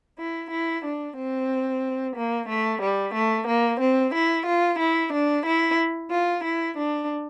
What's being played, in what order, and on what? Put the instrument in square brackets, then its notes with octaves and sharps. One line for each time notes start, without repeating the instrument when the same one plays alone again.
[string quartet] E4
E4
D4
C4
A#3
A3
G3
A3
A#3
C4
E4
F4
E4
D4
E4
F4
E4
D4